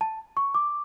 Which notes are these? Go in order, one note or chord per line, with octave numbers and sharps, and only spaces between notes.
A5
C#6
D6